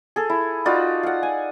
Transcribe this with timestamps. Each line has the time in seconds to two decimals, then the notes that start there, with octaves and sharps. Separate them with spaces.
0.16 G#4 A4
0.30 E4
0.65 D#4 F4 F#4 D5
1.03 F5 F#5
1.23 G#5